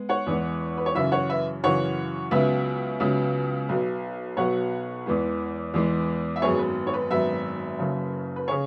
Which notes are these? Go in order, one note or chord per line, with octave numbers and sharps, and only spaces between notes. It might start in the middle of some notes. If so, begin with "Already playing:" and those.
Already playing: G#3 B3
C#5 F#5
E2 E3 G#3 B3
B4
C#5
F#2 C#3 E3 B4 E5
C#5 F#5
B4 E5
F#2 C#3 E3 C#5 F#5
C#2 C#3 F#3 B3 B4 E5
C#2 C#3 F#3 B3
B1 B2 F#3 B3
B1 B2 F#3 B3 C#5 F#5
E2 E3 G#3 B3
E2 E3 G#3 B3
E5
G#1 F#2 F#3 B3 G#4 C#5
B4
C#5
B4
G#1 F#2 F#3 B3 B4 E5
F#1 F#2 C#3
B4
C#3 G#4 C#5